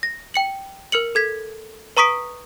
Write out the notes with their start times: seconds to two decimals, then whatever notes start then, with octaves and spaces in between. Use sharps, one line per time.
0.03 A#6
0.34 G5 C#7 F#7
0.92 A#4 F6 C#7 F#7
1.15 A4 G#6 B6
1.97 B4 A#5 C#6 D#6 B6 D7